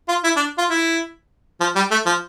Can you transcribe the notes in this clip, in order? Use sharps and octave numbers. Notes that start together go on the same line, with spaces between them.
F4
E4
D4
F4
E4
F3
G3
A3
F3